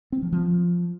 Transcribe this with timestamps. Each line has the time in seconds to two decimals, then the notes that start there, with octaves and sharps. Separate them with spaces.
0.12 C4
0.22 F3
0.32 F3